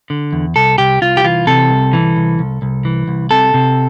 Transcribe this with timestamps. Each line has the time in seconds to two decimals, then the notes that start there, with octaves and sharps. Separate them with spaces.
0.10 D3
0.33 E2
0.56 C2 A4
0.78 C2 G4
1.01 C2 F4
1.17 G4
1.24 E3 F4
1.47 C3 A4
1.70 C2
1.93 E3
2.16 C2
2.39 C2
2.62 C2
2.85 E3
3.08 C2
3.31 C3 A4
3.54 C3